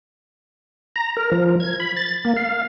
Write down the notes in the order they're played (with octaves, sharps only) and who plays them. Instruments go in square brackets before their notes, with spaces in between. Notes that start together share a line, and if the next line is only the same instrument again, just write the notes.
[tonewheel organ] A#5
A#4
F3
G#6
B5
A6
A#3
F5